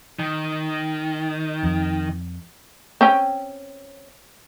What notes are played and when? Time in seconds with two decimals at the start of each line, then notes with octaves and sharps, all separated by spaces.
0.19 D#3
1.63 F2
3.01 C4 C#4 G5